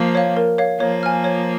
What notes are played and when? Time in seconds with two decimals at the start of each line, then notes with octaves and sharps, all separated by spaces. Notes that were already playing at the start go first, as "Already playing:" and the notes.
Already playing: F3 A#3
0.15 C#5 F5
0.37 A#4
0.58 C#5 F5
0.80 F3 A#3 C#5
1.03 G#5 F6
1.24 C#5